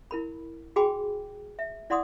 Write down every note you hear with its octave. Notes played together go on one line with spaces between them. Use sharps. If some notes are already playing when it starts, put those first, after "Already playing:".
E4 A#4 B5
F#4 G#4 G5 G#5 B5 D6
E5
E4 D5 F#5 C6 D6 D#6